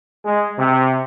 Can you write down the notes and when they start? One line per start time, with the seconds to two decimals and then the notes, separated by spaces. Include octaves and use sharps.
0.24 G#3
0.58 C3